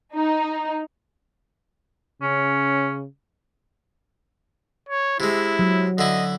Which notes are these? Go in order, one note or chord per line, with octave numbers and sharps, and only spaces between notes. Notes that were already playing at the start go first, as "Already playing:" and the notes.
D#4
C#3 C#4
C#5
C3 G#3 E4
F#3
D3 E4 D#5